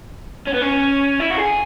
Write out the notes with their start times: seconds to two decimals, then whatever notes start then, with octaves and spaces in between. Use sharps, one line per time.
0.47 C#4
0.54 B3
0.62 C#4
1.20 E4
1.31 F#4
1.38 G#4